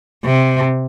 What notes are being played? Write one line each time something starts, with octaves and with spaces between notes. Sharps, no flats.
C3